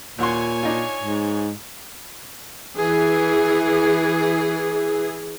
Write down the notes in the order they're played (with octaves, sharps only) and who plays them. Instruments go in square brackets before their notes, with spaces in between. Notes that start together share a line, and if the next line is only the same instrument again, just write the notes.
[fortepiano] D#2 F#5 C6 [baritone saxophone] A#2 [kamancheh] C#5 G#5
[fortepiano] D4 D#4 F4
[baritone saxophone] G#2
[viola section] E3 G#4